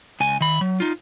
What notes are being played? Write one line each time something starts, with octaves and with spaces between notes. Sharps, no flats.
C#2 G#5
D#3 B5
F#3
D#4 F4